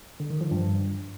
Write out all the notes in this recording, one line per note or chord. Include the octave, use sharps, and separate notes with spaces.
D3
D#3
F3
G2